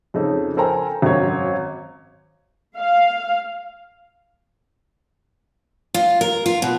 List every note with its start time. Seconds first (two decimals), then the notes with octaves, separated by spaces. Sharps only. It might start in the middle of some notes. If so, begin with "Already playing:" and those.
0.14 F2 C#3 D#4 A4
0.57 A4 A#4 C5 G5 G#5 A#5
1.02 G#1 F#2 F#3 C#5
2.78 F5
5.94 F4
6.21 A#4
6.46 F4
6.62 B2